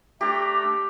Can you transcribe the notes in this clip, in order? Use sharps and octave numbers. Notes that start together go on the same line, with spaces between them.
A3 D4 G4 G5 A#5